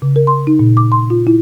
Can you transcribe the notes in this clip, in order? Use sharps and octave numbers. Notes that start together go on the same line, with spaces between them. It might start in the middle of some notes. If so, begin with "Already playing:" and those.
C#3
A#4
C6
D#4
A#2
D6
C6
F4
E4